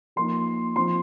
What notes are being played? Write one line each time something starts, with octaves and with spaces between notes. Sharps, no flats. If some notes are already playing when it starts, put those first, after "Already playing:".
F3 A#3 D#4 C6
F3 C4 D#4 C6